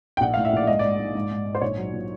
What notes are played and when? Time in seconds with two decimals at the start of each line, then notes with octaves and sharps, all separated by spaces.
0.17 G5
0.21 A#1 F#5
0.34 A2 F5
0.45 E5
0.53 A#1 D5
0.67 G#2 D#5
0.79 G#2 D5
1.00 G#2
1.15 G#2
1.31 G#2
1.46 G#2
1.55 C5
1.61 A#1 C#5
1.77 F#3
1.93 A#2